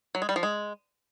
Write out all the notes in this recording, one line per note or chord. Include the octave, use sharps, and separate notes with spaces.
F#3
G#3
G3
F3
G#3